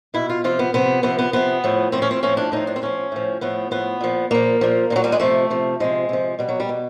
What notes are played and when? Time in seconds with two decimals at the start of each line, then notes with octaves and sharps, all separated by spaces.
0.14 B2 E4
0.29 F4
0.44 C3 F3 F4
0.59 B3
0.74 C3 F3 B3
1.03 C3 F3 B3
1.19 B3
1.33 C3 F3 B3
1.64 A2 F3
1.92 A2 F3 C4
2.02 C#4
2.11 C4
2.23 A2 F3 C#4
2.37 D4
2.52 A2 F3 D#4
2.67 D4
2.76 C4
2.82 A2 F3 C#4
3.12 A2 F3
3.41 A2 F3 B3
3.71 A2 F3 B3
4.01 A#2 F3
4.31 A#2 F3 A#3
4.61 A#2 F3
4.90 A#2 F3
4.96 F#3
5.04 G3
5.12 G#3
5.20 C3 F3 A3
5.50 C3 F3
5.80 C3 F3 G#3
6.09 C3 F3
6.39 B2 G3
6.49 F#3
6.60 G3
6.69 B2